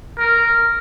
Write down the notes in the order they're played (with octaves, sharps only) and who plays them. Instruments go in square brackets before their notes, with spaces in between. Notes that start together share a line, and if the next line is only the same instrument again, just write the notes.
[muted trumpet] A#4